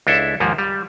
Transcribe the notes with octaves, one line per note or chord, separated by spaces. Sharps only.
C#2 D4 E4 A4 E5
D#2 G#2 F3 A#3
G3